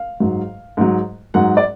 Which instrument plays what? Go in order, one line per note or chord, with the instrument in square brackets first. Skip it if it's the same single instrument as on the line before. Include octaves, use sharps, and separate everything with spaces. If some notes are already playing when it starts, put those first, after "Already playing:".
Already playing: [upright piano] F5
G#2 F#3
G#2 F#3
G#2 F#3 F#5
D5